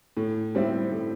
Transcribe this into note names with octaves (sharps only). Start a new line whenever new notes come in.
A2
G3 C4 E4
A2